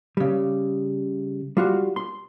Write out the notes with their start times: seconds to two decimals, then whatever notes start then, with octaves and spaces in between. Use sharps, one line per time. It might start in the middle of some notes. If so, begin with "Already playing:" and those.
0.17 C#3 G3
1.57 G3 F4 F#4
1.96 C6